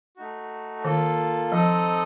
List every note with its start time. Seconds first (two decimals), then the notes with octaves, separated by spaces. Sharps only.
0.17 A3 D#4 F#4
0.84 D#3 A#3 F4 A4
1.52 F3 C4 D#4 A4 D#5